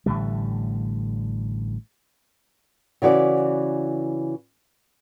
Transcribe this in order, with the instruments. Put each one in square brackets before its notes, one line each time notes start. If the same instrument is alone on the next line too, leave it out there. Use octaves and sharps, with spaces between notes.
[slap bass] A1 A2 D3 G3
[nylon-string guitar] C#3 E3 F#4 D5